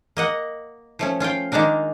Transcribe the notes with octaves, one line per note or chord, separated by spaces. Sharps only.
A#3 D#5 F#5
F3 A3 C#4
C#4 F4 F5 G5
D#3 G#3 A#3 D4 A#4